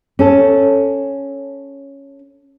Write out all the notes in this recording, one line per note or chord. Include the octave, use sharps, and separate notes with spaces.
C#4 A4